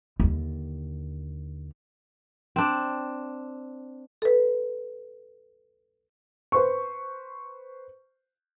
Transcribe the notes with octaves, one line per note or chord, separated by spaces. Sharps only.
D#2 D3
C4 D4
A4 B4
B4 C5 C#6